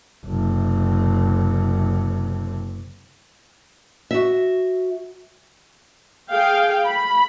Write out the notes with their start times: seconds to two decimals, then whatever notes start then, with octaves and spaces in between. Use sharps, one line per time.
0.26 F#1 C3
4.11 F#4 E5
6.31 G#4 F5 G5
6.85 B5